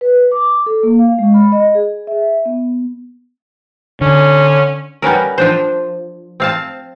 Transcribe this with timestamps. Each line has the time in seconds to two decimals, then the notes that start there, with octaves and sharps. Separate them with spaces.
0.01 B4
0.32 D6
0.66 A4
0.83 A#3
0.99 F5
1.19 G#3
1.34 B5
1.52 D#5
1.75 G#4
2.07 E5
2.46 B3
4.01 D3 C#4
5.02 G3 B3 C#4 A#4
5.38 F3 D4 C5
6.40 C4 F5 A5